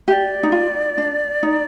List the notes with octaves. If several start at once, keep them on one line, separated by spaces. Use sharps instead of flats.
G4 D5 E5
D#4
F4
D4
D#4